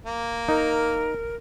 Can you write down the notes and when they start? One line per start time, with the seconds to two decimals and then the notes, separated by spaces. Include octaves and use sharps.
0.06 A#3
0.48 D#4 A#4